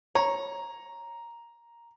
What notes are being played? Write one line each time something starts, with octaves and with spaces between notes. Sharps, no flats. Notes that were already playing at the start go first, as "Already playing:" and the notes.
C#5 A#5